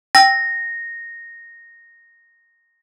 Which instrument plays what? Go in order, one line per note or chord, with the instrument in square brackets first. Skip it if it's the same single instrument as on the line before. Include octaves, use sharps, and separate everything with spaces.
[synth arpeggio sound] G5 G#5 E6 [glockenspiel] A#6